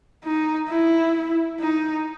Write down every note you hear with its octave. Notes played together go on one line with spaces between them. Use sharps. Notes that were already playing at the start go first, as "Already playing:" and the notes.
D#4
E4
D#4